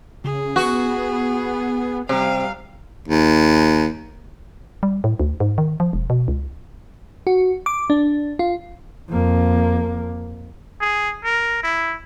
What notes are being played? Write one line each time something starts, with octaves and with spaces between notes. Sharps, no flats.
C#3 G#4
B3 F#4
C3 G3 F5
D#2
G3
A2
D2
G#2
D#3
F3
E1
B2
C#2
F#4
D6
D4
F4
F2 A#3
G#4
A#4
E4